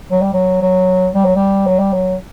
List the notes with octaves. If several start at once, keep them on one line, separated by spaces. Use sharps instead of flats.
F#3
G3
F#3
F#3
G3
F#3
G3
F#3
G3
F#3